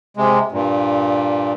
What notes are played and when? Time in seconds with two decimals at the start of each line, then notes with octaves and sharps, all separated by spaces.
0.17 C3 G#3
0.52 G2 A#2